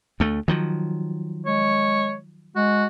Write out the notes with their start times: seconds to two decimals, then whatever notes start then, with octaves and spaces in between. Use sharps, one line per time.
0.20 D2 A3
0.48 D#3 F3 F#3
1.46 G#3 C#5
2.56 G#3 F#4